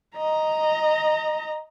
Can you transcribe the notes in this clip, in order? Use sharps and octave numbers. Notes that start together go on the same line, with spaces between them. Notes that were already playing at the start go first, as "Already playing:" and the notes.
D#5 A#5